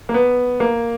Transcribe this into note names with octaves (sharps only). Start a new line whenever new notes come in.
A#3
B3
A#3